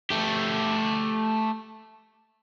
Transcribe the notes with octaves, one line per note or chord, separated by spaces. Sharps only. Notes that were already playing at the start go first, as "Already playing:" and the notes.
A3 G4